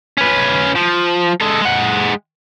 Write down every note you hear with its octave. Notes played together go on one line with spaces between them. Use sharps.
C#4 B4
F3
G#3 A4
G#3 F#5